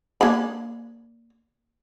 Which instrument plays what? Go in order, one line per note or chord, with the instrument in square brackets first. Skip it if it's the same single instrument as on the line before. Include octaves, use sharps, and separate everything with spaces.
[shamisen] A#3 D4 B5